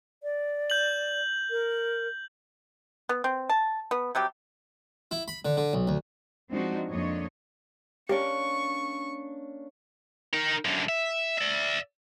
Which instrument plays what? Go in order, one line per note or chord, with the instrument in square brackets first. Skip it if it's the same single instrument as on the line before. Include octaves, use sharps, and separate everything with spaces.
[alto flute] D5
[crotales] G6 F#7
[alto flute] A#4
[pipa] B3
C4
A5
B3
C3 F#3 G3 G4
[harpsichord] E4
B5
D3
D3
B1
D2
[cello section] F3 G#3 C4 D4 D#4 F#4
F2 A#3 D4 C#5 D#5
[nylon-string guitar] A#3 C#4 D4 [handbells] G4 [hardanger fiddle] C#6
[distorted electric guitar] D#4 A#4
F#2 D3
E5
D5 E5